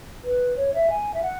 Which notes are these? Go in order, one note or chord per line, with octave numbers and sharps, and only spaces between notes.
B4
C#5
E5
G#5
E5
F#5